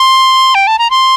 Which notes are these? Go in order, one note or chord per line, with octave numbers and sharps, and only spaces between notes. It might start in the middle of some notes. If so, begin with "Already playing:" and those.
Already playing: C6
G5
A5
A#5
C6